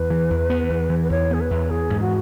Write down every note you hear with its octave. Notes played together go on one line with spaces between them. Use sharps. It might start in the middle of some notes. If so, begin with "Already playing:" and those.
Already playing: E2 B4
E3
E2
B3
E2
E3
B4
E2 C#5
B3 G#4
B4
E2
E3 G#4
G#2
F#4